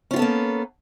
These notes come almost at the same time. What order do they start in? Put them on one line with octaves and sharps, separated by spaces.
C#4 F4 B3 A4 A#3